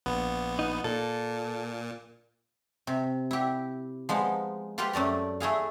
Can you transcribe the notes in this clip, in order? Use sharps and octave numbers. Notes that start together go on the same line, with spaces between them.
A#1 B3
D#4
A#2 A4
C3
E4 G4
F3 G#3 B3 D#4
F4 G4 B4 C5 F5
F#2 A3 D5 A#5
A3 E4 G#4 F5